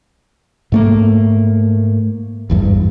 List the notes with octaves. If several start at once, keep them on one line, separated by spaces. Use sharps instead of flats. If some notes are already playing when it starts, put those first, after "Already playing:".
G#2 A3 A#3
G#1 E2 G2